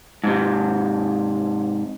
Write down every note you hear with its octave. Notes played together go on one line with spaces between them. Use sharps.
G#2 C3